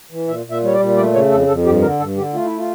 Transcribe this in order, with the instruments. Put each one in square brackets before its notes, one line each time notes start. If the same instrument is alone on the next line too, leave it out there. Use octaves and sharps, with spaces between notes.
[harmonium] E3
A#2 E5
A#2
E5
G3 C#5
D5
A#2
A3 D5
C#3 C#5
F2 A4
F2 A4
G2 G4
D3 A#4
G2 A4
D3 G4
A3 F4
E4
F4